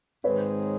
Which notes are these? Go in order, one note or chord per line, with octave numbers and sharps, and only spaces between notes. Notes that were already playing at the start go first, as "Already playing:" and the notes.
G#2 D#3 G#3 C4 B4 C#5